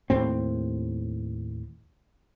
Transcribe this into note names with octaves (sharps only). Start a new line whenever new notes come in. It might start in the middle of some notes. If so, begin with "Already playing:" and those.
D#2 A2 C4